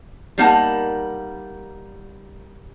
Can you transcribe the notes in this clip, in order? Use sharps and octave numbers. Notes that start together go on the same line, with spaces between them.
G3 A#3 D#4 A#4 F#5 A5